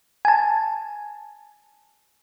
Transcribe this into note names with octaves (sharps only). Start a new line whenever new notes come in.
G#5 A5